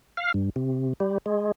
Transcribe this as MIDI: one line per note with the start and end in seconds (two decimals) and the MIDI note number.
0.17 0.32 77
0.34 0.50 43
0.56 0.93 48
1.00 1.18 55
1.26 1.52 56